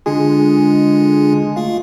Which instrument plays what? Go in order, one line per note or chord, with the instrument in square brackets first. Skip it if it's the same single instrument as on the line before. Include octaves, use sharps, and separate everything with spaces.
[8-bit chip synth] D3 D4 F4 [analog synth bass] G#3
[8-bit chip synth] A3 F4 F5